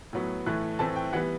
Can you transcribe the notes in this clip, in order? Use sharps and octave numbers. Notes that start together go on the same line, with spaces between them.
A2 F#3 B3
A2 E3 A3 F#6
A2 E3 A3 C4 A5
G5
E3 G3 B3 F#5